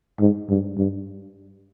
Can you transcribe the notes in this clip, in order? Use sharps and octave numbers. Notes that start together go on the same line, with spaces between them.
G#2
G2
G2